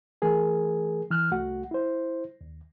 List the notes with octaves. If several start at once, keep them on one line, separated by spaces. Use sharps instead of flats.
E3 A3 G#4 A#4
E3 F6 F#6
C2 A3 F#4 F#5
E4 C5
D#2